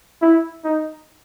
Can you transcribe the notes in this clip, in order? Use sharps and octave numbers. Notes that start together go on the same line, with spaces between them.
E4
D#4